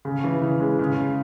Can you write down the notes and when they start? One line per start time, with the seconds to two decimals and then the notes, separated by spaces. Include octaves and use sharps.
0.05 C#3
0.24 E3
0.42 C#3
0.60 G#3
0.79 C#3